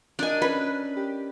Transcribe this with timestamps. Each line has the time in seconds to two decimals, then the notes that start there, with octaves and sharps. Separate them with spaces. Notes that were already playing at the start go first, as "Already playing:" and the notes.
0.19 D4 A#4 D#5 G#5
0.42 C#4 B4
0.97 G4